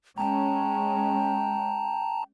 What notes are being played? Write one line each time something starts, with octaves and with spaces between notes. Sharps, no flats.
G#3 C#4 G5 A5 A#5